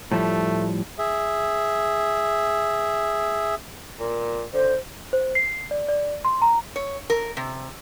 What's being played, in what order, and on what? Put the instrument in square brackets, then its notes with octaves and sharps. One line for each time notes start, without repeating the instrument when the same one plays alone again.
[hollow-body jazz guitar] A2 F3 G3 [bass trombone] A3
[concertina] G#4 E5
[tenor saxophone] A#2
[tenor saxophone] D3 [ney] C5
[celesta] C5
C7
D5
D5
C6
A#5
[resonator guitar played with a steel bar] C#5
A#4
C3